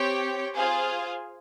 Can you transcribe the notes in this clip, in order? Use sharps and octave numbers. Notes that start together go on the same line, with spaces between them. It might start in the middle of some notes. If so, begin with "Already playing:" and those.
Already playing: C4 G4 C#5 G5
F4 G#4 C5 F5 G#5